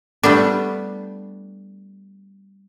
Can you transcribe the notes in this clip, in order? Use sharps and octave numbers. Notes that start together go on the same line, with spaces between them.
G3 A3 B3 D4